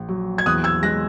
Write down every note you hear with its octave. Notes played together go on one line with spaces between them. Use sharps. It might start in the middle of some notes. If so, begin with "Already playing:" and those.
Already playing: A#1
F#3
G#6
E2 D#6 F#6
E6 G#6
G#3 F#6 A#6